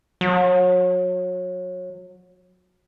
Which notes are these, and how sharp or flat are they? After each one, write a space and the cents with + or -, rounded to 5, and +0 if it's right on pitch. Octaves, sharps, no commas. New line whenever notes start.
F#3 -30